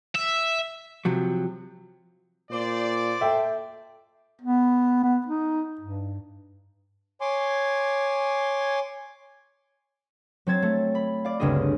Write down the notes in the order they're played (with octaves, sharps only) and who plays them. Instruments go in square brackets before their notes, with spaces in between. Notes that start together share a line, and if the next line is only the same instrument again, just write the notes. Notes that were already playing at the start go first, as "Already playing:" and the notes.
[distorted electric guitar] E5
[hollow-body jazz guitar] C3 F3 F#3
[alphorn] A#2 [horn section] C5 D5
[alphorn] A4 [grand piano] E5 G5
[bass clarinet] B3
B3
D#4
G2
[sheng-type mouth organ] C#5 G#5 C6 D6
[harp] F#3 C4 C5 G#6 A6
A3
B5
D5 F5
G1 D2 C#3 C4 G#4 D#5